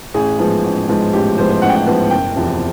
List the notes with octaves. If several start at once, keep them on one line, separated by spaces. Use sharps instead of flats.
A1 G#4
G#2 F3 G#3 B3
A1
G#2 F3 G#3 B3
A1 G4
G#2 F3 G#3 B3 C5
C5
A1 F#5
G5
F#5
G#2 F3 G#3 B3
F#1 G5
E2 C3 F3